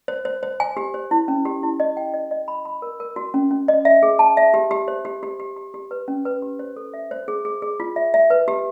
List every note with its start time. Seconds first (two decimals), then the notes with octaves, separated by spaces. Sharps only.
0.08 C5
0.25 C5
0.43 C5
0.60 G#5
0.77 G4
0.94 C5
1.11 E4
1.28 C#4
1.45 G4
1.63 E4
1.80 D#5
1.97 G5
2.14 D#5
2.31 D#5
2.48 B5
2.65 B5
2.82 A#4
3.00 A#4
3.16 F#4
3.34 C#4
3.51 C#4
3.68 D#5
3.85 E5
4.03 G#4
4.19 A5
4.37 E5
4.54 G4
4.71 G4
4.88 C5
5.05 G4
5.23 G4
5.40 G4
5.57 G4
5.74 G4
5.91 B4
6.08 C#4
6.25 B4
6.42 G4
6.59 C5
6.77 A4
6.94 E5
7.11 C5
7.28 G#4
7.45 G#4
7.62 G#4
7.80 F4
7.96 E5
8.14 E5
8.30 B4
8.48 G4